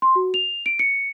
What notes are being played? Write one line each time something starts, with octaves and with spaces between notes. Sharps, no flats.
C6
F#4
F7
D7
C#7